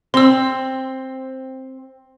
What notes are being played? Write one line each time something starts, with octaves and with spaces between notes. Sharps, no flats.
C4 C6 E6